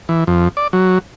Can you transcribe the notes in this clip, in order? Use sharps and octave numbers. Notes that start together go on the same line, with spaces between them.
E3
F2
D5
F#3